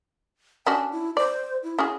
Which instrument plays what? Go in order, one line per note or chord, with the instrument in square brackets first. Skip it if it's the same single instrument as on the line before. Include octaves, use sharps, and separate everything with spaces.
[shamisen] C#4 D4 F#4 [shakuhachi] G#5
[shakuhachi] E4
[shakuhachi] C5 [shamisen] D5
[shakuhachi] E4
[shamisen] C#4 F#4 G#4